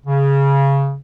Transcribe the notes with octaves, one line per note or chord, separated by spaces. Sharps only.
C#3